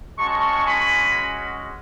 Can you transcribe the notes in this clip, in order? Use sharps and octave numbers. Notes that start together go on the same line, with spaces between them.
G#3 C#4 F#4 A5 C#6
G#5 B5